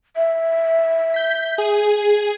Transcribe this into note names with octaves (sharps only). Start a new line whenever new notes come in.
E5
G6 B6
G#4